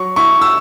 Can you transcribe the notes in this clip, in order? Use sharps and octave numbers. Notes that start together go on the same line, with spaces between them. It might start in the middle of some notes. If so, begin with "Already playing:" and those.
Already playing: F#3 C#6
E4 C#6
E6